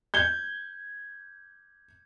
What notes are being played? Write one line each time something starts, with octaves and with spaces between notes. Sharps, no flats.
G6 G#6 G7